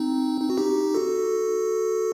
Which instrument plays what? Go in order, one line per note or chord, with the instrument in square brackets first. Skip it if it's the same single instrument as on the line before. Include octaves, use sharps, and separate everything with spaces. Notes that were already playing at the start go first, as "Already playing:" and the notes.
Already playing: [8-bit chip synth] C4 D#4
D#4
F#4
D#4 G4
F#4 A4